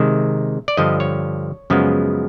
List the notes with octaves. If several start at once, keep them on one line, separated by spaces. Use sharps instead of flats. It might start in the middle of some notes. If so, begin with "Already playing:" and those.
Already playing: C3 D#3 G#3 E5
D5
G2 D3 F3 D#5
C#5
F#2 C#3 F3 G#3 B3